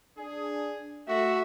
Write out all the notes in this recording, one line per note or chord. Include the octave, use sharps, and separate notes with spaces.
D4 G#4
A3 F#4 E5